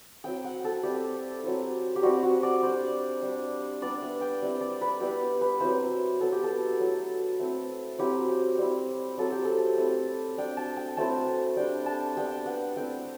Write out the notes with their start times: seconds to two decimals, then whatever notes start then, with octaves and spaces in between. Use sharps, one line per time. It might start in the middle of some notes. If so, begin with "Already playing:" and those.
0.24 F#3 C4 E4 G5
0.44 F#5
0.64 A4
0.83 G3 C4 E4 G4
1.44 F#3 C4 E4
1.96 G4
2.03 G3 C4 E4 F#4
2.23 F#4
2.43 D5
2.62 G3 D4 C5
3.22 G3 D4
3.82 G3 B3 D4 D5
4.02 E5
4.21 G5
4.42 G3 C4 E4
4.61 D5
4.81 B4
5.00 G3 B3 E4 G4
5.41 B4
5.60 F#3 C4 E4 C5
6.20 F#3 B3 E4 A4
6.32 G4
6.43 A4
6.80 F#3 A3 E4
7.39 A3 C4 E4
7.99 F#3 C4 E4 G4
8.28 G4
8.58 G3 C4 E4
9.18 F#3 C4 E4 A4
9.32 G4
9.45 A4
9.78 A3 C4 E4
10.38 G3 D4 G5
10.57 A5
10.77 G5
10.97 F#3 A3 C4 E4 A5
11.56 G3 D4 G5
11.86 A5
12.17 G3 B3 D4 G5
12.46 F#5
12.76 A3 C4 E4 G5